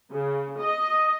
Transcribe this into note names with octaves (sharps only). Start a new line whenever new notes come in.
C#3
D#5